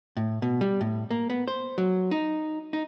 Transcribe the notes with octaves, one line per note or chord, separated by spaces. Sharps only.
A2
B2
G3
A2
A#3
B3
C5
F#3
D#4
D#4